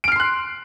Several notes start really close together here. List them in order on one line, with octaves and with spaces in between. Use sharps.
D7 F6 C7 C6 F#6